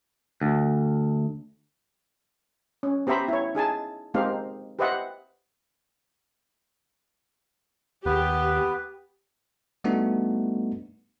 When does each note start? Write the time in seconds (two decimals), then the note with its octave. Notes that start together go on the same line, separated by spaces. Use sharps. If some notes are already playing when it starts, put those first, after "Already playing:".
0.41 D2
2.83 C#4
3.07 B3 G4 C5 E5 A#5 B5
3.28 E4 C#5
3.55 D#4 G#4 G#5 A5
4.14 G#3 A#3 C4 D#4 G4 F5
4.79 G4 B4 C5 D#5 E5 F#5
8.06 D#2 B3 G4 B4
9.84 G3 A3 B3 D4 D#4 F#4